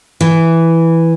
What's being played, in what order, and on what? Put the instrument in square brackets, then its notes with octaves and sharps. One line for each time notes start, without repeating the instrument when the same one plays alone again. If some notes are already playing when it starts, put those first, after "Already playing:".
[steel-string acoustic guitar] E3